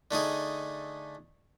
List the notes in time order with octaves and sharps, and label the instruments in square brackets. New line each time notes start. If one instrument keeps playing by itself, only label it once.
[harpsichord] D3 A3 D#4 G#4